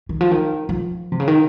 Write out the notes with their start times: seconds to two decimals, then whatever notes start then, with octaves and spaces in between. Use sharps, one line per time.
0.09 D#3
0.21 F3
0.31 D#3
0.69 F3
1.12 C3
1.20 C#3
1.28 D#3